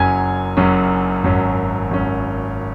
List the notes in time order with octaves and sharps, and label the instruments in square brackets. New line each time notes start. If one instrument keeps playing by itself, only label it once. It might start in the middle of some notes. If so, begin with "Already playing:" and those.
Already playing: [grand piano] F#1 F#2 F#3 C#4 G#5 G#6
F#1 F#2 F#3 C#4
G#1 F#2 F#3 C#4
G#1 F#2 F#3 C#4